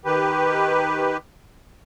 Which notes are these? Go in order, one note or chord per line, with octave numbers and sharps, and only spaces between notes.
D#3 G4 B4